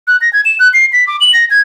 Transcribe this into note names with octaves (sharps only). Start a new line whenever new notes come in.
F#6
A#6
G#6
E7
F#6
C7
B6
D6
F#7
A#6
G#6